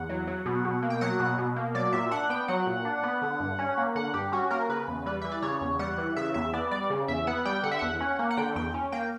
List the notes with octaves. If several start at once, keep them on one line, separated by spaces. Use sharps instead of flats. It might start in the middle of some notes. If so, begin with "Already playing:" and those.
Already playing: E2 F#5
F#3
F#3
B2
B2
A#3
G5
F#3 F#5
B2
B2
A#3
F#3 D5
A#2 E5
D4 F#5
B3 G5
F#3 F#5
A#2
D4
B3
D3
G2
C#4
A#3
D3 F#5
G2 G4
C#4 F#4
A#3 A#4
C#3 B4
E2
G3 B4
E3 E5
D5
C#3 C#5
E2
G3 F#5
E3
C#3 E5
E2 E5
B3 D5
G3 D5
C#3
E2 E5
B3 F#5
G3 G5
D3 F#5
E5
E2 F#5
C#4
A#3
F#5
D3 G5
E2 G5
C#4
A#3 G5